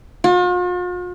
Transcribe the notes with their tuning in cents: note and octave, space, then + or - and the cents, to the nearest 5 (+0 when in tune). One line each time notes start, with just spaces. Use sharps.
F4 +45